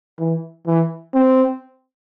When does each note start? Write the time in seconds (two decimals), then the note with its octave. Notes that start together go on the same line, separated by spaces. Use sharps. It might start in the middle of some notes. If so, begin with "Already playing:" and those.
0.20 E3
0.67 E3
1.14 C4